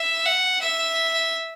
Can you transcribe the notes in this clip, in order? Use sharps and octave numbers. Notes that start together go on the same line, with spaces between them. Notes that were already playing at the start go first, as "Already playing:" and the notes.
Already playing: E5
F#5
E5